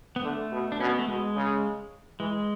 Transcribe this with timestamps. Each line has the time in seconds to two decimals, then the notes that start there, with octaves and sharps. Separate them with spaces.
0.16 B3
0.23 D3 A3
0.52 B2
0.72 D4
0.80 B2 C#4
0.89 B3
0.99 A3
1.08 B2 G#3
1.36 C#3
2.20 E3 G#3